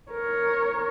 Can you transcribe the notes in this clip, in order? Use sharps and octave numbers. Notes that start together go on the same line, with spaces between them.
A#4 C#5